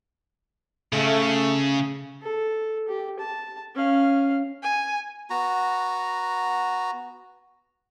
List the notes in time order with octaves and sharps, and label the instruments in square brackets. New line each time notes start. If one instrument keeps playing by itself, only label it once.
[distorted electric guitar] C#3 [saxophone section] A3
[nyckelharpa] A4
G4
A5
C#4 F5
[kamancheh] G#5
[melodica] B3 F#4 A#5